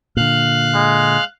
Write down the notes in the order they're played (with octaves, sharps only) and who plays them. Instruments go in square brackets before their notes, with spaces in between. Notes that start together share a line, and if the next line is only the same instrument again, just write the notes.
[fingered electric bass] A#2 D3 [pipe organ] F5 F#6
[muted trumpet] G#3